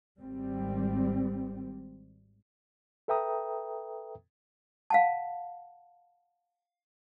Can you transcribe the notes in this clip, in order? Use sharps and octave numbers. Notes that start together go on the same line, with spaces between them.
G#1 G3 C4
A4 B4 E5 G5 A#5 D#6
F5 F#5 A5